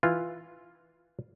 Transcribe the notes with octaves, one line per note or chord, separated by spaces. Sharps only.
E3 F4